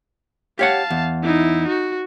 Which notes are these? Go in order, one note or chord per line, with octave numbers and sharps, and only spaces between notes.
G4 C#5 F5 F#5 A5
E2
D#4 E4
F#4